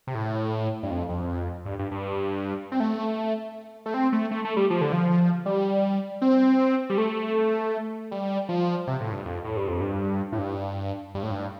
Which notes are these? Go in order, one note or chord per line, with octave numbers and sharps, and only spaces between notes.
C3
A2
G2
F2
F2
G2
G2
G2
C4
A3
A3
C4
A3
A3
A3
G3
F3
D3
F3
G3
C4
G3
A3
G3
F3
C3
A2
G2
F2
A2
G2
F2
G2
A2
G2
G2
A2
G2